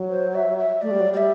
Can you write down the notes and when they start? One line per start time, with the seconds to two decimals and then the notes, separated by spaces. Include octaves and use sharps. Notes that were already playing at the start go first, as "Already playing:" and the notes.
Already playing: F#3
0.10 C5
0.35 E5
0.58 E5
0.82 A3 D5
0.91 G3
1.00 F#3
1.10 G3 D5
1.17 E5